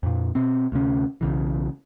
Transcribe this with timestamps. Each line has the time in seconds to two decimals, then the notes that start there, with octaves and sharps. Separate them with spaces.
0.03 F2 A#2
0.35 B2 C4
0.72 D2 C3 C#4
1.21 B1 C#3 E3